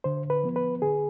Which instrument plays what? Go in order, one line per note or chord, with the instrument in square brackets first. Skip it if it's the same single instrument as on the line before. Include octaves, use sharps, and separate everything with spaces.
[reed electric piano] D3 C5
B4
F3 B3
B4
D3 G#4